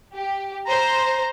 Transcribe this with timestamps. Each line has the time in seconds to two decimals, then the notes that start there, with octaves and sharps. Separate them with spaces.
0.15 G4
0.68 C5 A#5